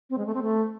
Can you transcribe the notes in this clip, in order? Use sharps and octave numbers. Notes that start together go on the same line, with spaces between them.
C4
G#3
A3
C4
A3